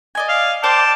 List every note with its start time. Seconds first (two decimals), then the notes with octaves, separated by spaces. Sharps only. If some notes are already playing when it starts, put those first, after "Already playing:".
0.15 D5 D#5 G#5
0.29 F5
0.63 C5 D5 G5 A5 D6